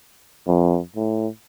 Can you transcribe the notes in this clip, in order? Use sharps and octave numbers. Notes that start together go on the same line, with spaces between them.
F2
A2